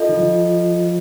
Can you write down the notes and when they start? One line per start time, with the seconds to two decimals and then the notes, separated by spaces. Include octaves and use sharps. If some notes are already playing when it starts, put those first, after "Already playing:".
Already playing: F4 A4 D#5
0.09 D#3
0.17 F3